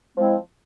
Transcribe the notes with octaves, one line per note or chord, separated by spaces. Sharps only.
F3 G#3 C4 E4